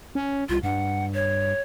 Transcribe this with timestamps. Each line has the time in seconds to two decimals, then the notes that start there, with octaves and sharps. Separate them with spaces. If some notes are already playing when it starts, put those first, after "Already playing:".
0.15 C#4
0.49 C2 F4
0.63 G2 F#5
1.14 C#5